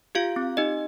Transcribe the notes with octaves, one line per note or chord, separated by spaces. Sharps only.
F4 G4 F5
C4
D#4 G4 D#5